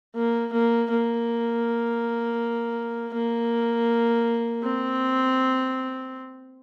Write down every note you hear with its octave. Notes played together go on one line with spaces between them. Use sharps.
A#3
A#3
A#3
A#3
C4